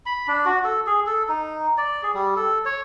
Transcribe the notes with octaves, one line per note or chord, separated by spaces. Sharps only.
B5
D4
F#4
A4
G#4
A4
D#4
D5
G#4
G3
A4
C#5